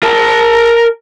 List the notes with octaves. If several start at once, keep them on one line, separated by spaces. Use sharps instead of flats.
A#4 A5